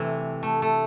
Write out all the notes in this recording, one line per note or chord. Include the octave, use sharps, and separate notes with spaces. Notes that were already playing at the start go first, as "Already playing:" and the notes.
Already playing: C3 E3 A3
A3
A3